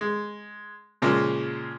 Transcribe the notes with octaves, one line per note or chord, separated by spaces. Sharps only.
G#3
A#2 C#3 F3 G#3 A#3